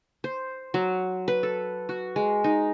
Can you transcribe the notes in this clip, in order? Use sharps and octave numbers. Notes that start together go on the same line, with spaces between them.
C5
F#3
B4
A4
F#4
G#3
D#4